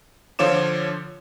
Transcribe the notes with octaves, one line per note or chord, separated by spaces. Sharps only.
D3 F3 F4 C#5 D6 E7